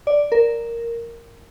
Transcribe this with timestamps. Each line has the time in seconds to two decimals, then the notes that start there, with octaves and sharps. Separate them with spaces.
0.07 D5
0.32 A#4